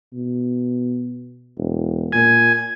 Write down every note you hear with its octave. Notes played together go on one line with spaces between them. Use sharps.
B2
E1
A#2 G#5